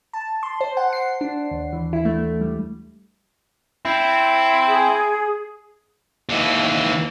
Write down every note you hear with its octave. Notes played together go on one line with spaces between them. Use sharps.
A5
C6
C5
F#5
C7
D4
D#2
E3
E4
A3
G3
C4 E4
G#4
D#2 E3